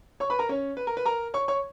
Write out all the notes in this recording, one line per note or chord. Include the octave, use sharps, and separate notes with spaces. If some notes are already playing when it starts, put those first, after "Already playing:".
C#5 C#6
B4 B5
A#4 A#5
C#4 C#5
B4
A#4
B4
A#4 A#5
C#5 C#6
C#5 C#6